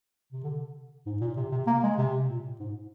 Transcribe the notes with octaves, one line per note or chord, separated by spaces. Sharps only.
C3
D3
G#2
A#2
C3
C3
A#3
G#3
C3
A#2
G#2